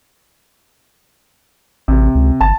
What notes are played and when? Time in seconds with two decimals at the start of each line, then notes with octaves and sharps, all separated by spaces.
1.88 A1 C3
2.15 C#2
2.41 G1 A5